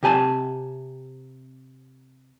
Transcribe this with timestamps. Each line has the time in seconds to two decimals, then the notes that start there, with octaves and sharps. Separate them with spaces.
0.03 C3 G4 G#5 A5